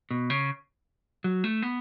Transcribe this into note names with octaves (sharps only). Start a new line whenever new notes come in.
B2
C#3
F#3
A3
B3